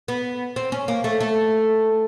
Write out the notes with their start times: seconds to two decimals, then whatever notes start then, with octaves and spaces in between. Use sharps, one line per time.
0.08 B3
0.56 C4
0.72 C#4
0.88 A#3
1.04 A3
1.21 A3